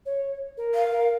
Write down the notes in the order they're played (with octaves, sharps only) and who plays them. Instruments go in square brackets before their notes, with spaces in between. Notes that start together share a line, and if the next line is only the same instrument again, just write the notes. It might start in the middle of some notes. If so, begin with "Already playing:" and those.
[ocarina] C#5
A#4
[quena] F5
[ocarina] A#4